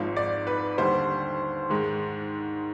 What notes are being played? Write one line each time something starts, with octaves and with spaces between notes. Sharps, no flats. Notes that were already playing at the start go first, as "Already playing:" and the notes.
Already playing: G#1 G#2 F3
D5
B4
D#2 D3 G3 C5
G#2 D#3 G#3